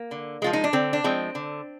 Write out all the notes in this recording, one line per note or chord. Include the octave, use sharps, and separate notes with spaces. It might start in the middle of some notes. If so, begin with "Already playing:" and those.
Already playing: A#3
D3
F3 G#3 F4
D#4
D4
D3 C4
D4
F3 G#3 C4
D3